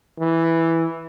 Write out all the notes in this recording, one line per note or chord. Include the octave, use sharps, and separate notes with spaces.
E3